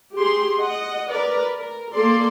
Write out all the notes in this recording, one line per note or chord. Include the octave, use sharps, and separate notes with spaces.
G4 G#4 C6
D#5 F#5
A#4 B4 D5
A#4
A#3 A4 D5 C6